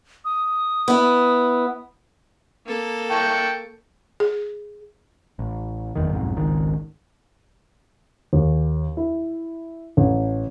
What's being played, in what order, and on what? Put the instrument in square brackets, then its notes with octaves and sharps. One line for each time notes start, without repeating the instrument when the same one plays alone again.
[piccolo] D#6
[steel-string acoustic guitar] B3 E4
[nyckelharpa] A#3 A4
[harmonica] G5 A5 C#6
[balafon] G#4
[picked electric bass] A1
F#1 E2 D#3
B1 F2 G#2
G#1 C#2 D#3
[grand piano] D#2
E4
A1